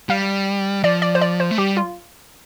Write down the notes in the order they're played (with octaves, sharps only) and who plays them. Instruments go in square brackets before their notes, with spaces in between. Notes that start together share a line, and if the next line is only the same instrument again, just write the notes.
[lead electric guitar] G3 [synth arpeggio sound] F5
[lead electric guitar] F3 [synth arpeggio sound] D5
[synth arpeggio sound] D5
C5
D5
C5
[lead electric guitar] A3
[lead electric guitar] G3 [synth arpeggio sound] G4
[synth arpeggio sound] F4